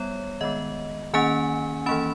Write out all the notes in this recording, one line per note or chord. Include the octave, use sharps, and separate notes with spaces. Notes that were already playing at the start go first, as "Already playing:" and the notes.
Already playing: G3 B3 C#5
D#3 G#3 B3 D#5
D#3 A#3 C#4 G#5
E3 A#3 C#4 B5